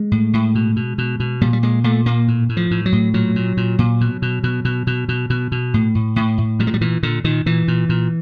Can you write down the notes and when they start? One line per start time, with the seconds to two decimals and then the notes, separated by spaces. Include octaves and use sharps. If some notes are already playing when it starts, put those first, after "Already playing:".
Already playing: G#3
0.12 A2
0.33 A2
0.55 B2
0.76 B2
0.98 B2
1.20 B2
1.41 A#2 G3
1.53 G3
1.63 A#2 G#3
1.84 A#2 A3
2.06 A#2 A#3
2.28 A2
2.49 A2
2.57 F3
2.71 A2
2.86 F#3
2.92 A2
3.14 A#2 F#3
3.36 A#2
3.57 A#2
3.79 A#2
4.01 B2
4.22 B2
4.44 B2
4.65 B2
4.87 B2
5.09 B2
5.30 B2
5.52 B2
5.74 A2
5.95 A2
6.16 A2
6.38 A2
6.59 A#2 G3
6.67 G#3
6.74 G3
6.81 A#2 E3
7.03 A#2 D3
7.24 A#2 D#3
7.46 A#2 E3
7.68 A#2
7.89 A#2